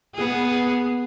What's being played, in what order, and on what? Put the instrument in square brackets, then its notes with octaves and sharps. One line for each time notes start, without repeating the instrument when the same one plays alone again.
[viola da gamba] B3 G#4